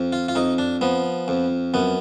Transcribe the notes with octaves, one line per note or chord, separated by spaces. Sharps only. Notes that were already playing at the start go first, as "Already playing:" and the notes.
Already playing: F2
F4
F4
F2 D#4
D4
F3 B3
F2
F#2 B3